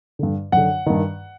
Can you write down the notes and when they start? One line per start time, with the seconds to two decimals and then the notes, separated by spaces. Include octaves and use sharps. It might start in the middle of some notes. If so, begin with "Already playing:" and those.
0.19 G2 D3
0.52 F#2 D3 F#5
0.86 G2 D#3